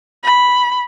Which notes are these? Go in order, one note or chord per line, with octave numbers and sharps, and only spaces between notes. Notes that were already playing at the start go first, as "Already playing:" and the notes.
B5